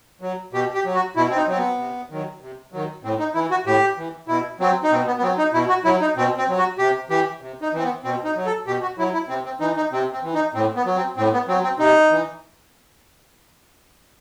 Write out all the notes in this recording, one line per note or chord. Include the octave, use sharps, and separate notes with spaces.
F#3
B2 G4
G4
F#3
F#4
B2 E4
C4
D#4
F#3 C4
B3
C3
D#3 F#3
C3
D#3 F#3
A2 C4
D#4
E3 E4
F#4
A2 G4
E3
B2 E4
F#3 C4
D#4
B2 C4
B3
B3
F#3 C4
D#4
B2 E4
F#4
F#3 E4
D#4
B2 C4
C4
F#3
F#4
C3 G4
E3 G4
C3
D#4
E3 C4
B3
B2 C4
D#4
F#3
A4
B2 G4
F#4
F#3 E4
E4
C3 C4
C4
E3 D#4
D#4
C3 C4
C4
E3
D#4
A2 C4
B3
F#3
C4
A2 C4
B3
F#3 C4
C4
C3 D#4
E3